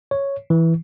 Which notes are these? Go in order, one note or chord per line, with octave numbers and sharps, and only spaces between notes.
C#5
E3